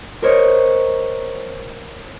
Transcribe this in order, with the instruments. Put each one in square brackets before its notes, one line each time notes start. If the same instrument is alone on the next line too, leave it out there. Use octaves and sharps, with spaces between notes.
[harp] A#4 C5 C#5 D#5